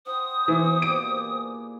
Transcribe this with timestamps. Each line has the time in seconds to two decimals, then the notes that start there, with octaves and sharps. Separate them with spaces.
0.06 E4 C5 F#5 G5 D#6
0.48 B2 E3 D6
0.82 A#2 G4 D5 D7
1.13 E4 G#4